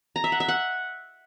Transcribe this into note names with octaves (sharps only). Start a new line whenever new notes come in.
A#5
E5
F#5
E5
F#5